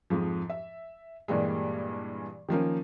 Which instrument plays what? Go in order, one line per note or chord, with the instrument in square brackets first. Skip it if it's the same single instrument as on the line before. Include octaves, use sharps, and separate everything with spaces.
[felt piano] F2 G#2 F3
E5
G2 A#2 E3 G3 G#3
D#3 F3 A#3 C#4